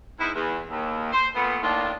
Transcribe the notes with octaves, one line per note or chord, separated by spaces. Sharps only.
G#2 B3 D#4 E4
E2
D#2
C5
A#2 A3 B3
A2 D#3 A#3 D4 F4